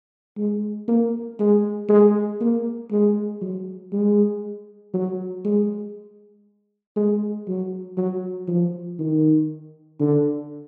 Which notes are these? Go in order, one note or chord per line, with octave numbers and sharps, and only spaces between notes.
G#3
A#3
G#3
G#3
A#3
G#3
F#3
G#3
F#3
G#3
G#3
F#3
F#3
F3
D#3
D3